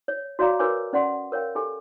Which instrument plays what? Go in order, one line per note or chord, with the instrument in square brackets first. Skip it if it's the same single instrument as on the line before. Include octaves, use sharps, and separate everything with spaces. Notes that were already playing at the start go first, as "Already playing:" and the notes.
[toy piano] C#5
F#4 C#5 D5 F5 A#5 D6
F#4 A#4 B4 C#5 G#5 D6
C#4 D5 F#5 C6
A#4 C#5 F5 G5
G4 A4 G#5